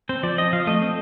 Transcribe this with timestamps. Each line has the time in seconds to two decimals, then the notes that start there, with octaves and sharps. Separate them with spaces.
0.09 C4 C5
0.23 F3 D5
0.38 C4 D#5
0.53 F3 F5
0.67 A3 D#5
0.82 C4